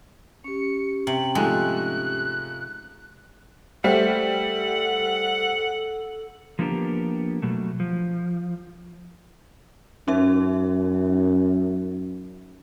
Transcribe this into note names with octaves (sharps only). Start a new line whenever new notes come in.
C#4 G4 C#7
C3 F#7
G#2 F3 G#3 A3 F#6
G3 A3 A4 C5 E5 F#5
F3 A#3 B3 D4 G4 A#4
B2 F#3 A3
F3
F#2 C#4 D#4 E5